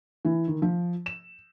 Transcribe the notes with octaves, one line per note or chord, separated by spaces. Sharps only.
E3
D#3
F3
E7